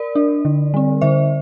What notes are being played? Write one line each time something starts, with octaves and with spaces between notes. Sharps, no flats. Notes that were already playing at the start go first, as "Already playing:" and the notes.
Already playing: A#4 D5
D4
D3
G3 C4
D3 C5 E5